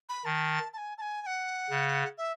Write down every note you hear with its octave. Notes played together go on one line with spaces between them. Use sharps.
B5
D#3 A5
A5
G#5
A5
G#5
G#5
F#5
C#3
E5